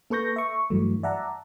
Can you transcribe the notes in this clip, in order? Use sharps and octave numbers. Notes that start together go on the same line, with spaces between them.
A#3 A4 B4 C#6 G6 A#6
E5 C#6
G2 E3 F#3 A3
D5 E5 F#5 A5 A#5